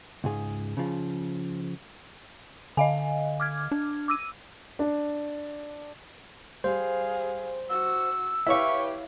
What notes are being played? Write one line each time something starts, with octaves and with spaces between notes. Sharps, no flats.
C#2 G#2 G#4
C#3 F3
D3 D#5 F5 G#5
D6 F6 G#6
D4
D6 E6 D#7
D4
G3 G#4 C5 F5
F#4 E6
E4 G4 B4 C#5 E5 F5 C#6